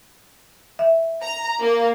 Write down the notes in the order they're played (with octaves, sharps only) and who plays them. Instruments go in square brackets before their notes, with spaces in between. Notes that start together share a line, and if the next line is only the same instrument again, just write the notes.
[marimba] E5
[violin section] A#5
A#3